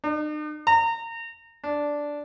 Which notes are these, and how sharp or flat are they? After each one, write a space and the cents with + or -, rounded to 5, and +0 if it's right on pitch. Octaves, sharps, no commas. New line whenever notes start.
D#4 -45
A#5 -25
D4 -5